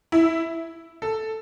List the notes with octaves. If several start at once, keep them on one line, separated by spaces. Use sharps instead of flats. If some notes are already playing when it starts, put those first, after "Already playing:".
E4
A4